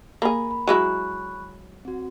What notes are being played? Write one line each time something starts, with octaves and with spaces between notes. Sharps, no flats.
A#3 G#4 B5
B5
F#3 G#3 E4 B5 C#6 F#6
C4 F#4